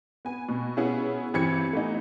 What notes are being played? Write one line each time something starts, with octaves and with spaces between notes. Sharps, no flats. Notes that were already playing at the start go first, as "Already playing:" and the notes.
B3 G#5
B2
B3 C#4 E4 F#4 G#4
G2 E3 C4 G#6 C#7
A3 B3 D#4